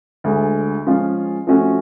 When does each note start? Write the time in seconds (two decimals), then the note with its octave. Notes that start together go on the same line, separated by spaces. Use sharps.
0.24 D2 D3 G#3
0.87 F3 G#3 C#4 F4 G#4
1.47 F3 A3 C#4 F#4